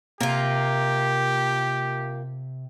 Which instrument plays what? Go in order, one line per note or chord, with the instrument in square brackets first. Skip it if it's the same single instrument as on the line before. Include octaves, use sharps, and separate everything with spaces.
[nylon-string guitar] C3 [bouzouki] A#3 F4 [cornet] G4